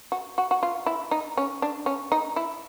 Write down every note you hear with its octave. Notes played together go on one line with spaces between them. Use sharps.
F#4
F#4
F#4
F4
E4
D#4
C#4
D4
C#4
D#4
E4